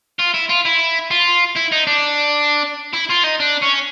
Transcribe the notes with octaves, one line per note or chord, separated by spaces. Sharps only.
F4
E4
F4
E4
F4
E4
D#4
D4
E4
F4
D#4
D4
C#4